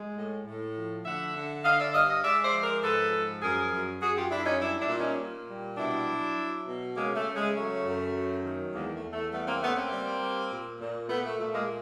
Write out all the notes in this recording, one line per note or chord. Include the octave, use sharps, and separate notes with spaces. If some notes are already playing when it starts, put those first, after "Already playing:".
Already playing: G#3
A2
A2
F3
D3 E5 F#5
D3
D3 D#5 F5
D5 E5
G2 D#5 F5
D#5 F5
G#3 D5 E5
C5 D5
F3
A#4 C5
G#2 A4 B4
F3
F#2 G#4 A#4
F#2
F#2 F#4 G#4
F4 G4
F#2 D4 E4
C#4 D#4
G3 D4 E4
D4 E4
A#2
C#4 D#4
A#2
G3
B2 D4 E4
F#3
F#3
B2
C#3 G#3 A#3
A3
C#3
G#3
F#3 A3
F#2
F#3
D#3
E2 G#3 A#3
A3
E2
A3
G3 A3 B3
A#3 C4
C#3 A3 B3
A#3 C4
G3
G3
A#2
A#2
A#2 A3 B3
A3
A#2 A3
G#3 A#3